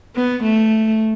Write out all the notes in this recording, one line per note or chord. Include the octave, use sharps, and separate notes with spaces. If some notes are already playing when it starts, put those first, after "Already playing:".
B3
A3